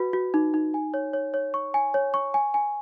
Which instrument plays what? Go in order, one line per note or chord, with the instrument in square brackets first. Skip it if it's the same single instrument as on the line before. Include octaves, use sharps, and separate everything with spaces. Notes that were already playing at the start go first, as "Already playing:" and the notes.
Already playing: [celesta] F#4 B4
F#4
D#4
D#4
G#5
C#5
C#5
C#5
C#6
G#5
C#5
C#6
G#5
G#5